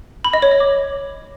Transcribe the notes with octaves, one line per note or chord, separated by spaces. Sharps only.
B5
D#5
C#5
D#5
D6